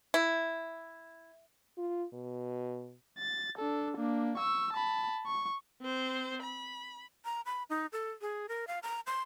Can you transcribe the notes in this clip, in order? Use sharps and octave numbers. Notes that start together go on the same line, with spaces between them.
E4
F4
B2
A6
D4 A4
A#3 D4
C#6 E6
A5 B5
C#6
C4 C5
B5
A#5
B5
D#4
A4
G#4
A#4
F5
A#5
C6